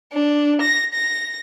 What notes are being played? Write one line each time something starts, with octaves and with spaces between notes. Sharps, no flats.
D4
A#6
A#6